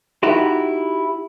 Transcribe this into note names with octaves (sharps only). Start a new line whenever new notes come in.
D#4 E4 F#4 G4